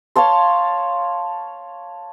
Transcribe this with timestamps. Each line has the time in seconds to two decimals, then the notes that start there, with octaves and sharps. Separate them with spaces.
0.16 C#5 F5 A5 C6